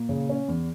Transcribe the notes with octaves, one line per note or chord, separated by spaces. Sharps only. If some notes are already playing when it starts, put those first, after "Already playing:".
Already playing: A#2
C#3
C#4
E2